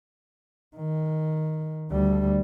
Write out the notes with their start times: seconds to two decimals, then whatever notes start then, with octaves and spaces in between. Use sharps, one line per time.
0.77 D#3
1.91 D2 G3